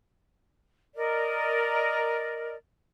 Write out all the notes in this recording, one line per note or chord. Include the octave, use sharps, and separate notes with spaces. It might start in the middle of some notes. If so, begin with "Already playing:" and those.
A#4 D5 D#5